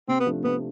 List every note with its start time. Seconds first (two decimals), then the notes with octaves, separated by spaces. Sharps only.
0.08 C3 C4
0.20 B3
0.27 F3 A3 D4
0.44 C3 B3